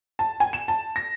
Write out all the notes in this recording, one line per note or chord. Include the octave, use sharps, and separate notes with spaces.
A5
G#5
E7
A5
A#6